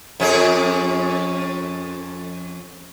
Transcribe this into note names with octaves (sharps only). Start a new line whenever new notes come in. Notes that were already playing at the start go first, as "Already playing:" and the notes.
F2 C#4 G#4